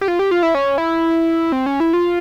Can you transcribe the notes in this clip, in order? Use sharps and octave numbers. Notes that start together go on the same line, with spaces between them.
G4
F4
G4
F4
E4
C#4
E4
C4
C#4
E4
F4